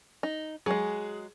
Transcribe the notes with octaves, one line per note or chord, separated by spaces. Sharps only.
D#4
F#3 G#3 G#4